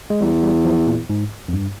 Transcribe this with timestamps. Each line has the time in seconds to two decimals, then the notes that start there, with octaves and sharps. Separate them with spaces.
0.10 G#3
0.21 E2 G3
0.43 G3
0.65 F3
0.87 A#2
1.10 G#2
1.48 F2
1.53 G2